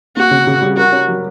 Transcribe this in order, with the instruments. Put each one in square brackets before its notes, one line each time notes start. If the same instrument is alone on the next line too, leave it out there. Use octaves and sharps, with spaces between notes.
[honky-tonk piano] A#3 [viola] F#4
[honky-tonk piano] C#3
C#3
G3
[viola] F#4 [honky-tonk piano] A#4
[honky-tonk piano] C#4
F#3